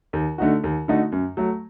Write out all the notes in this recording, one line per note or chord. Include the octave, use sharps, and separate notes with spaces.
D#2
D3 A3 D#4 F#4
D#2
D3 A3 D#4 F#4
F#2
F#3 A3